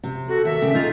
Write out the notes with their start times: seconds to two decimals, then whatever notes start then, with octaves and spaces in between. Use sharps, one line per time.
0.03 C3
0.28 F#4 A4
0.45 D#2 E5
0.62 A#2 C#3 G4
0.74 D#4 F4 G#4